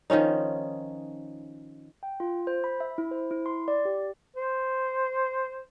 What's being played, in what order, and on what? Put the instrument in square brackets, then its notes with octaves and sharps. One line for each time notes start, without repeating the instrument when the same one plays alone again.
[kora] D#3 F3 C#4 D#4
[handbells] G5
F4
C5
B5
E5
E4
C5
E4
C6
D5
G4
[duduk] C5